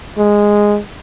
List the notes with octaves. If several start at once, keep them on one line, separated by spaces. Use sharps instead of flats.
G#3